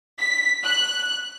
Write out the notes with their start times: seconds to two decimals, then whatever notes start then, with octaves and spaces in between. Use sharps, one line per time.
0.19 B6
0.64 F#6